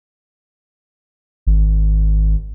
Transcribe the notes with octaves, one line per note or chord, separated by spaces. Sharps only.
G#1